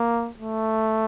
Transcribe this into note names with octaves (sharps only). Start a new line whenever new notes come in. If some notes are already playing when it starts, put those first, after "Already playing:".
Already playing: A#3
A3